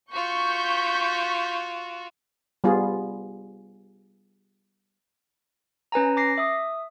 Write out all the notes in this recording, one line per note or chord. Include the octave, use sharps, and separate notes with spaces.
F4 F#4 C#6 G6 B6
G3 B3 F4 G#4
C#4 B4 G#5 A#5
D6 A#6 C7
E5 D#6